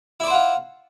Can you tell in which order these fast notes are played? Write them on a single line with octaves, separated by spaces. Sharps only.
E4 D5 C5 F#5 F4